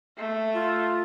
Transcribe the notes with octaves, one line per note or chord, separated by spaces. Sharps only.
A3
F4